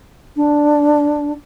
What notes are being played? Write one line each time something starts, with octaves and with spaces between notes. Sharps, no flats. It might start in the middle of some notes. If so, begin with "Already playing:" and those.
D4